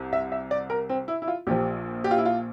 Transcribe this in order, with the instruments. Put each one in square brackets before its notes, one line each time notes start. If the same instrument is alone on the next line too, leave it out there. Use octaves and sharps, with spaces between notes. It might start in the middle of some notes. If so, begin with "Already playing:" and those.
Already playing: [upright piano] C2 C3
E5
E5
D5
A#4
C4
E4
E4
F4
A#1 A#2 F3 G4
G4
F4
E4
F4